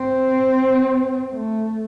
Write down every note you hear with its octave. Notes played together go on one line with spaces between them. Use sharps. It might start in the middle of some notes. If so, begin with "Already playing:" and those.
Already playing: C4
A3